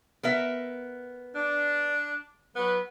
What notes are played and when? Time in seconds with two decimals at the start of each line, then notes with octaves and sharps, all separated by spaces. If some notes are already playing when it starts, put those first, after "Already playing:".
0.23 B3 A#4 E5
1.34 D4
2.55 F#3 B3 B4